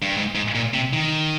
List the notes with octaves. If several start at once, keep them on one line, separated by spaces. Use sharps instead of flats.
G2
G#2
G#2
A#2
C3
D#3